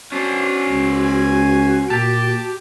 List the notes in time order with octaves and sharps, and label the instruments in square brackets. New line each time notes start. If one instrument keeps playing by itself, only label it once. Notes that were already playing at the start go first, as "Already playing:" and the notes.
[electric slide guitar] C#4 C5 [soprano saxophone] D4 [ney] F#4
[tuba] C#2
[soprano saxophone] G#5
[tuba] A#2 [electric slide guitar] G4 [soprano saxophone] A5